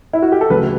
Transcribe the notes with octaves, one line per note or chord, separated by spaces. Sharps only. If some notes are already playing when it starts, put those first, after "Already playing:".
E4
F#4
G4
A4
D2 C#3 F#3 A3 B4